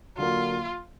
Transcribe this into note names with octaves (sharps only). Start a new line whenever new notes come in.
D3 F#3 A#3 F4